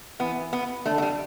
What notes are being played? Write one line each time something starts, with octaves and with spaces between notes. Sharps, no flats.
E3 B3
B3
D3 A3
A3
G3